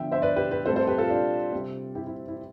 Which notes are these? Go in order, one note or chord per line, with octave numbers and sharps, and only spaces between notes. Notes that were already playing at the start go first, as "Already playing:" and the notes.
Already playing: D3 F3 B3 E5 G5
C5 E5
B4 D5
G4 B4
G4 B4
A2 G3 C4 A4 C5
A4 C5
G4 B4
F4 A4
D4 F4
C3 G3 C4
E4 G4
E4
E4